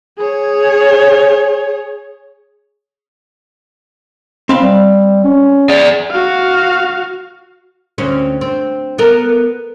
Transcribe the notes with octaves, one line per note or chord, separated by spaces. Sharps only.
G#4 C#5
C4 F5 B5
G3
C#4
G#4 D5
F#4 F5
D2 C4 C#4
C4
B3 A4 A#4